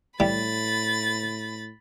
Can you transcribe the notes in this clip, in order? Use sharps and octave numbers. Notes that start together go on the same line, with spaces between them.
A2 E3 G3 B5 A6